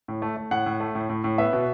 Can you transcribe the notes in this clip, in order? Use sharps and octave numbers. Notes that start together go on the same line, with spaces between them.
A2
A3
A3
A2 F#5
A2
A3
A2
A2
A2
B3 E5
B2